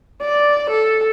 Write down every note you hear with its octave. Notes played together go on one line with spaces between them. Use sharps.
D5
A4